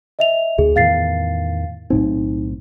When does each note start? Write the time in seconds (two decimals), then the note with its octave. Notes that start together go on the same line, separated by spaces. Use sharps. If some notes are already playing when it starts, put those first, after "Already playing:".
0.19 D#5 E5 F7
0.58 D2 G#4
0.76 E2 A2 D#3 F5 A6 C7
1.90 B1 A2 C4 D#4